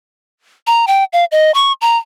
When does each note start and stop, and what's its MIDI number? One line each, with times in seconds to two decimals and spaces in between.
0.67 0.85 82
0.87 1.04 79
1.13 1.25 77
1.32 1.51 75
1.54 1.73 85
1.81 1.97 82